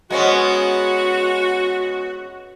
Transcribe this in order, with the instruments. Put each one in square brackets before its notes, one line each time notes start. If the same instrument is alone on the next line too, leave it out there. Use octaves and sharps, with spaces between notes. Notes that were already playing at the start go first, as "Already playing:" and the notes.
[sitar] G#3 B3 C#4 [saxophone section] F#4